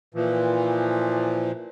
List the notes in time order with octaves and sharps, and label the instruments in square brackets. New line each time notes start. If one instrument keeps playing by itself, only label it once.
[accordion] A#2 E3 F3